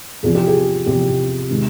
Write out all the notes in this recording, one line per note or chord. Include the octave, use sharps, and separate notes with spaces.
E2 C3 F3 G#4
G4
G#4
E2 C3 F3 G4
C3 D#3 G#3